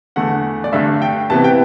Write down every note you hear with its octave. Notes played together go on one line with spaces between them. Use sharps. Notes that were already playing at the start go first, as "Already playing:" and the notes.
E2 D3 A3 F#5
D5
G2 D3 A3 E5
G5
C3 E3 B3 A5
G5